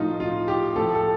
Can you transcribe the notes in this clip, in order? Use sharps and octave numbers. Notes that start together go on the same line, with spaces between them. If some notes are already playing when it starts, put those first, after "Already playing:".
Already playing: A2 F3 D#4 F4
F4
G4
A2 F3 A4
A4